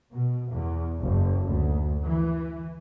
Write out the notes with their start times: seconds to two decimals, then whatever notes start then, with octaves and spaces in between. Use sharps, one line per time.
0.14 B2
0.52 E2
1.01 F#1
1.46 D2
2.06 E3